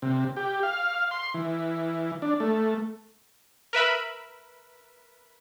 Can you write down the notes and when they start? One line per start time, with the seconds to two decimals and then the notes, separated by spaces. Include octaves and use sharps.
0.02 C3
0.36 G4
0.63 F5
1.11 C6
1.34 E3
2.22 D4
2.40 A3
3.73 A#4 B4 E5 B5